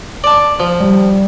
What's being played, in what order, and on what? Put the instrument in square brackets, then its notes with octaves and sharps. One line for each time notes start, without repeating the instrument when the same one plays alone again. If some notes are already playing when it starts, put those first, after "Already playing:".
[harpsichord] D5 A5
F3
[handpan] G3